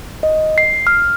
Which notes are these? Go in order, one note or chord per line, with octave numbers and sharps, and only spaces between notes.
D#5
C7
F6